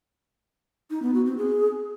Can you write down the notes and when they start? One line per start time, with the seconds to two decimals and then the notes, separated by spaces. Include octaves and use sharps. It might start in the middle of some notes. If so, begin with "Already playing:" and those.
0.91 D#4
1.02 B3
1.14 F#4
1.26 C4
1.38 G#4